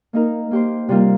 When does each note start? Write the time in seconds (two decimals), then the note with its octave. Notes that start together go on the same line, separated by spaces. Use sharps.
0.13 A#3 D#4 A#4
0.51 A#3 G4 C5
0.89 C3 G3 A#3 F4 A#4